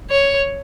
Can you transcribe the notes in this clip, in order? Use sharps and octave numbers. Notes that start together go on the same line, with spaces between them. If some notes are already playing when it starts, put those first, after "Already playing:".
C#5